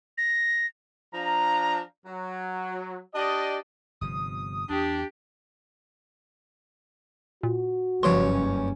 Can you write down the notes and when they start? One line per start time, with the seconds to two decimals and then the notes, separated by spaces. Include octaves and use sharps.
0.18 A#6
1.14 F3 D4 F5 A#5
2.06 F#3
3.14 D4 G4 D5 D#5
4.01 G1 C3 F3 D#6
4.70 E2 D4 G4
7.43 A#2 F#4
8.03 F#1 G2 F3 C#4 C#5 C6